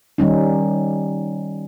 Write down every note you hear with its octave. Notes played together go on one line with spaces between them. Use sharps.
D#3 G3 C#4 D#4